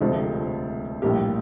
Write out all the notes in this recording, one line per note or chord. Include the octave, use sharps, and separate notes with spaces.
E1 D2 C3 F3 A3
A#1 A2 G3 A#3 G4